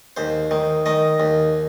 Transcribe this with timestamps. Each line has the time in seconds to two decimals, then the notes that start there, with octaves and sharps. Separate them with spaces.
0.17 D#2 C5
0.51 D#3
0.86 D#3 D#5
1.20 D#2